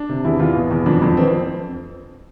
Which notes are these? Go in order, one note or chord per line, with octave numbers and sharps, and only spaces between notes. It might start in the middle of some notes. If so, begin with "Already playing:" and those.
Already playing: D4
C3
E2 E4
E2 F4
B2
E2
F2 D4
F2 C4
E3 C4
C4